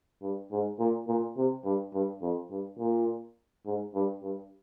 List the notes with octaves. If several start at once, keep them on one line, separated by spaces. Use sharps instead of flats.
G2
G#2
A#2
A#2
C3
G2
G2
F2
G2
A#2
G#2
G2
G2